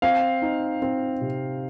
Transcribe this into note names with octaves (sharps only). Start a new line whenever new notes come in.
C4 F5
D#4
C4
C3